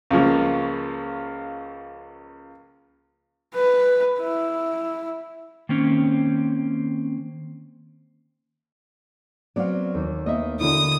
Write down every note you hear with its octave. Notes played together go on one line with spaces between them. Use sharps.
C#2 C#3 F3 A#3
B4
E4
D#3 A#3 C4 C#4
F#3 B3 C4 D5 F5
D#2
A#3 B3 D#5 E5
D3 A#3 E4 F#4 D#6